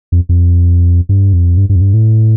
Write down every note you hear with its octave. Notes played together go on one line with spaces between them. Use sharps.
F2
F2
G2
F2
G2
G2
F2
G2
A2